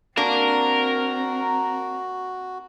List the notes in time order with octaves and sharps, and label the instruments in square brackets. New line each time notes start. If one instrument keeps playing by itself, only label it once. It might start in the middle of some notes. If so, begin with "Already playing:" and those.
[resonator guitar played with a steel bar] A#3 D4 [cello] C4 [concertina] F#4 [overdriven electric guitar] A#4